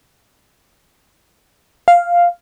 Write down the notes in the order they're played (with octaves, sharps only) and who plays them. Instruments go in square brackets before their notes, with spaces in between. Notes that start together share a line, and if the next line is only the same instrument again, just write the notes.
[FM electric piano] F5